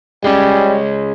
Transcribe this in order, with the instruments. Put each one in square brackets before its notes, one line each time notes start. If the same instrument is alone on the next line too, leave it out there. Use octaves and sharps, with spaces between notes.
[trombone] G3 [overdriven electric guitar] G#3 C#4